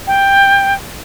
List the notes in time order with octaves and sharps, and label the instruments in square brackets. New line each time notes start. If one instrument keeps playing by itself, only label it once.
[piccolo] G5